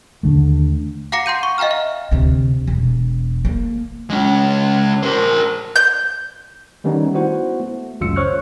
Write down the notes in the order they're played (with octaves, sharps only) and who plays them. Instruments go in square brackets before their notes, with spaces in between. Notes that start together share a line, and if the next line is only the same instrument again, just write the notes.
[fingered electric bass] D#2 D3 A3
[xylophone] F5 F#5 A#5 D6 A#6 C#7
F#5 C6 G6 D#7
C#6
D#5 F5 G5 A#5 F6
E5
[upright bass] D2 C3
E1
A#3
[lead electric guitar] G#3 C#4
A#4 C5
[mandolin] G6
[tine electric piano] D#3 G3 A3 B3 C#4 D#4
B3 E4 F#4 C5 F#5
A3
G#1 C#2 F#2 F4 E6 C#7
C5 C#5 C#6 F6 F#6